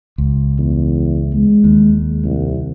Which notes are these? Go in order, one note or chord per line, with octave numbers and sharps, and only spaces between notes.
C#2
E2
G#3
D#2
C2